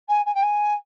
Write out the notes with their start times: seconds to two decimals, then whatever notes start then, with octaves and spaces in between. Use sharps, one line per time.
0.08 G#5
0.25 G#5
0.34 G5
0.42 G#5